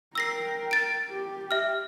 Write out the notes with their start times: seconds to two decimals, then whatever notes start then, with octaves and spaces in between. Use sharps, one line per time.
0.15 A#4 G5 E6 A#6 C7
0.71 A6 D7
1.10 G4
1.51 E5 F6